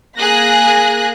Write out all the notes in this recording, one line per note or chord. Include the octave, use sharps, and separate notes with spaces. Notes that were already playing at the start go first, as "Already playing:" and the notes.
A#3 G#4 G#5 F#6 A#6